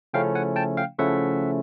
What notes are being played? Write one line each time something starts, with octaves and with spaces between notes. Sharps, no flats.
C#3 F3 A3 C#4 E4 F5 G5
F#5 G#5
G5 A5
F5 G5
C#3 F3 A3 C#4 E4 E5 F#5